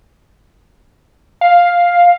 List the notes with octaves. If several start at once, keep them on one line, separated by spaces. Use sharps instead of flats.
F5